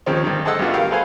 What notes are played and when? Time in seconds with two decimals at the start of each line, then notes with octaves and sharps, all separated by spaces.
0.06 D#2 D#3 F3 G#3 C4 C#4
0.24 G2 D#3
0.45 G#4 A4 C5 D#5 F#5 E6
0.59 G2 C#3 G3 B3 F4 F#4
0.74 G4 A#4 F5 D6
0.91 G#4 A4 B4 C5 F5 G#5